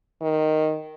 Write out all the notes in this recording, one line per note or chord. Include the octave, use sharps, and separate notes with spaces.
D#3